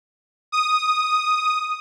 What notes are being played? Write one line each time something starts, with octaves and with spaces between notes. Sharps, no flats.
D#6